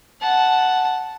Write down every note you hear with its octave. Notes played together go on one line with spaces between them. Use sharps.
F#5 A5